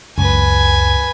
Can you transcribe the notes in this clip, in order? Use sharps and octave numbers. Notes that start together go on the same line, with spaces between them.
C#2 F#2 B4 G#5